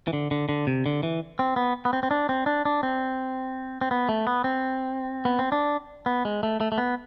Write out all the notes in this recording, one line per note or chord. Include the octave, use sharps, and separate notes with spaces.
E3
D3
D3
D3
C3
D3
E3
C4
B3
B3
C4
C4
D4
C4
D4
D4
C4
C4
B3
A3
B3
C4
B3
C4
D4
B3
G#3
A3
A3
A3
B3